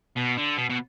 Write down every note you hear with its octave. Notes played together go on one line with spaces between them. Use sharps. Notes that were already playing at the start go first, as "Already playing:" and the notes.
B2
D3
B2
B2